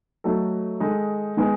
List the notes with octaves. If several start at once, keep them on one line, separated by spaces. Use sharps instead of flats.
F#3 A3 D#4 A4
D#3 G#3 D#4 A4
D#3 G#3 B3 D#4 G#4